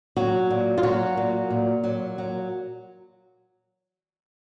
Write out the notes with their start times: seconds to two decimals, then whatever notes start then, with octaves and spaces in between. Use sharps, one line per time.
0.16 F#3 F#4
0.51 A#2
0.78 F4
0.83 F#3 F#4
1.17 A#2
1.50 A#2
1.84 F#3
2.18 F#3